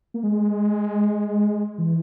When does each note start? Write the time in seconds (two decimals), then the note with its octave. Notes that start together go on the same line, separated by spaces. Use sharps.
0.14 A#3
0.23 G#3
1.78 E3